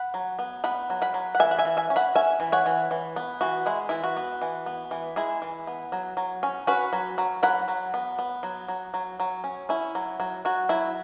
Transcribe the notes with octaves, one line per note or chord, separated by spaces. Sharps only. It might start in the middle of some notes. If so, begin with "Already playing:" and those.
Already playing: F#5 B5
F#3
B3
B3 F#5 B5
F#3
F#5 B5
F#3
F#5
E3 E5 G#5
F#5
E5 G#5
E3
E5 G#5
C#4
F#5 B5
C#4 E5 G#5
E3
C#5 F#5
E3
E3
B3
E3 F#4
G#3 E4
E3 E4
F#4
B3
E3
B3
E3
G#3 E4 G#4
E3
B3
F#3
F#3
C#4
C#4 F#4 B4
F#3
F#3
F#3 F#5 B5
F#3
B3
B3
F#3
F#3
F#3
F#3
C#4
C#4 E4
F#3
F#3
F#3 F#4
F#3 E4